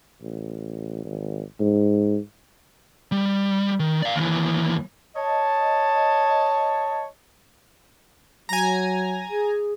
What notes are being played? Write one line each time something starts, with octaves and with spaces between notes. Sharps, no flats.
A1
G#1
G#2
G3
D#3
D5 F5
D#2 E3
C#5 D#5 A5
F#3 G#5 A#5
G#4